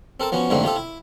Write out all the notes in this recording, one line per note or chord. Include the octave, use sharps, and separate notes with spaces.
C4 A4 A#4 A5
F3 B3 C#4 F#4
F2 G#2 D3 A3 A#3 C4
C3 F4 G4 A4
E4